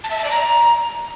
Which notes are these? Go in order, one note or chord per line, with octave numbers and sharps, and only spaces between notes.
A5
E5
A5
D5
A#5